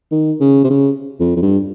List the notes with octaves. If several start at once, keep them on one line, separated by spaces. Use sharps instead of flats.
D#3
C#3
C3
C#3
F2
F2
G2